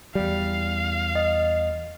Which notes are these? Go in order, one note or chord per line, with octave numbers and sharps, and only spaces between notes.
E2 G3 F5
D#5